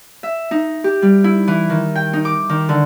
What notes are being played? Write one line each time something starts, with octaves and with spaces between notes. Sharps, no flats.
E5
D#4
G4
G3
E4
E3
D#3
G5
D#4
D6
D#3
D3